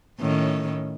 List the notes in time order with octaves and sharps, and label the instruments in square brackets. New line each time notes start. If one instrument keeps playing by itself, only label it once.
[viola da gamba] A2 D#3 C#4